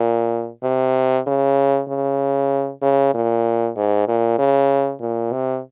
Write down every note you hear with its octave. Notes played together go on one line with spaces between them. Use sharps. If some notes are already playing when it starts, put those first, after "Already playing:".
Already playing: A#2
C3
C#3
C#3
C#3
A#2
G#2
A#2
C#3
A#2
C3